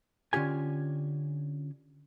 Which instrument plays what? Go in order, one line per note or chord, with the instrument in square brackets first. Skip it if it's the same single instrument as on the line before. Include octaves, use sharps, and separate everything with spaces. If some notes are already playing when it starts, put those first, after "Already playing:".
[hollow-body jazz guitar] D3 C#4 F4 G4 G#5